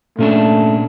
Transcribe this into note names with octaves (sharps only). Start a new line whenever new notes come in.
A#2 A3 C#4 D4